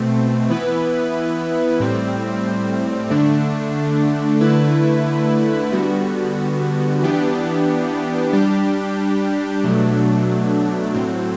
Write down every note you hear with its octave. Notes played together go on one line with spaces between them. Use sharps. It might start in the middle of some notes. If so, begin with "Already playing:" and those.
Already playing: B2 A3 C4
E3 B3 E4 B4
A2 G3 C4
D3 A3 D4
D3 A3 E4 B4
D3 G3 B3 F#4
E3 B3 D4 G4
G3 D4 G4
B2 F#3 A3 D4
A2 F#3 C4